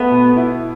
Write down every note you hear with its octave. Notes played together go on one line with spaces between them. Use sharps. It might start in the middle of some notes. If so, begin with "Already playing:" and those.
Already playing: A3 B3
B2
E4